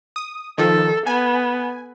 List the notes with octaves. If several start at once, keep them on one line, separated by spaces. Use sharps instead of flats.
D#6
D#3 F3 A4
B3 G#5